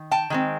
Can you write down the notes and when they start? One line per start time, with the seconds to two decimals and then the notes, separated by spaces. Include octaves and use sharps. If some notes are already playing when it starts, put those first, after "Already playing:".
Already playing: D#3
0.11 G5 A5
0.30 D#3 G#3 C4